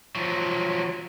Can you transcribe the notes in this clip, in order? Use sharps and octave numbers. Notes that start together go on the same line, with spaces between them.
F3 F#3